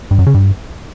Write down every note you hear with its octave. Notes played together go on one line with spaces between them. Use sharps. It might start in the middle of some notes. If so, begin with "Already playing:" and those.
G2
F#2
C#3
G2